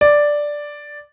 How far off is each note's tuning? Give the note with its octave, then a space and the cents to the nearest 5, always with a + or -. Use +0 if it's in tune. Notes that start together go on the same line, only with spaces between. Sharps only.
D5 +0